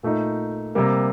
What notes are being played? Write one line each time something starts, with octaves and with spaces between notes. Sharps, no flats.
A#2 A3 D#4
C3 G3 A#3